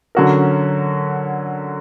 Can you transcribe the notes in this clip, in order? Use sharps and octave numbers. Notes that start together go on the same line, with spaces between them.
D3 F#3 C#4 F#4 A#4